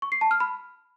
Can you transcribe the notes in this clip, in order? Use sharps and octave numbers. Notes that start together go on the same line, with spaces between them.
C#6
C7
A5
F6
B5